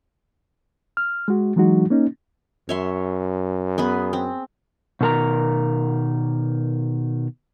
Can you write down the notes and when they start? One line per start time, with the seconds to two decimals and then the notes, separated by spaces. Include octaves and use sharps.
0.97 F6
1.28 G#3 F#4
1.56 E3 F#3 G#3 D#4 F#4
1.90 A#3 C#4 D#4
2.69 F#2 C#5 E5 C6
3.78 B3 G#4 B4
4.13 C4
5.01 B2 D#3 A4 A#4 A#5